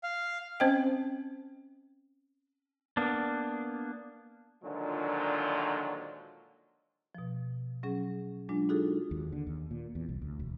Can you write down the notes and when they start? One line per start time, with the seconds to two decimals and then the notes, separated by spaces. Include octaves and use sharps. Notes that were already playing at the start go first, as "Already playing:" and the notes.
0.03 F5
0.60 C4 C#4 C5 D#5 G5
2.97 A#3 B3 D4
4.62 A#2 D3 D#3 F3 F#3 G#3
7.15 B2 F3
7.83 F#3 C#4 G#4
8.49 F#3 G#3 D4 F4
8.69 D#4 F4 F#4 G#4 A4
9.11 D#2
9.32 D3
9.47 D#2
9.71 A#2
9.95 E2
10.09 C2
10.22 D2
10.39 E1